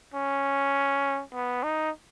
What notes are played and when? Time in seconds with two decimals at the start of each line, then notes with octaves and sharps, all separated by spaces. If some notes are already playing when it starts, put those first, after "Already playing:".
0.14 C#4
1.33 B3
1.63 D#4